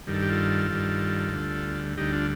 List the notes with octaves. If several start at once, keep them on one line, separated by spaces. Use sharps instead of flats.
G2 D#3 G3
A4
G4
F4 A4
G2 D#3 G3
D2 D3 G3
D2 D3 G3 D#4 G4
D4 F4